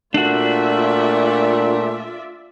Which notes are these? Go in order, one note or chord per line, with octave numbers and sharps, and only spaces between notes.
A#2 A3 D4 F4 F#4 D5 E5